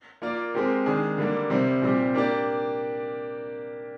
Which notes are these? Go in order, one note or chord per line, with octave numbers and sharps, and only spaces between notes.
A#3 F4 A#4 D5
G#3 C4 G4 A#4
D#3 G#3 D4 G#4
D3 G3 A#3 D4
C3 G3 C4
A#2 G3 C4 G4
A#3 D4 G4 D5